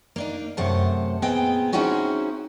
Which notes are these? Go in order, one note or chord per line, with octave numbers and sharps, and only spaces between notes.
A#3 D4 D#4
F#2 C3 A3 C5 F#5 A5
A#2 B3 C4 G#4 D#5 G5
C4 C#4 D#4 E4 F#4 G#4